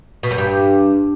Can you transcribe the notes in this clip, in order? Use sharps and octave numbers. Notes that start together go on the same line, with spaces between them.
B2
F#2
G2